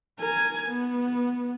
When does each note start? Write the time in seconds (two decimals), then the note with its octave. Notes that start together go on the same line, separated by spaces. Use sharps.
0.20 A#4 G#5
0.66 B3